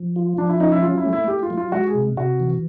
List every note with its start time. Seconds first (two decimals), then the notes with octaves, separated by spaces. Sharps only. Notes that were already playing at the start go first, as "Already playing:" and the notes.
Already playing: F3
0.16 F4
0.38 F3 D4
0.49 E4
0.60 C#4 D#4
0.72 E4
0.82 F#3 F4
0.98 E4
1.05 A3
1.13 E4
1.28 A3 G4
1.43 F4
1.50 F#3
1.57 F4
1.72 G#3 F#4
1.88 G#4
1.95 C3
2.17 C3 F#4
2.40 E3